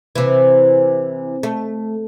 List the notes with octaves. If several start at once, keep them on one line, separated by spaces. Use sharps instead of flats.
C3 E3
A3